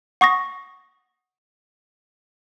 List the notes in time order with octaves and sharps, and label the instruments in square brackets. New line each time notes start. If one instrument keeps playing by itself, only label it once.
[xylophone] F#5 C#6 D#6 A#6